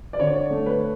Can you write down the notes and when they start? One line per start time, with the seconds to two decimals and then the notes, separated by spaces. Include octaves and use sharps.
0.13 D5
0.20 D3 C#5
0.50 A3
0.66 B4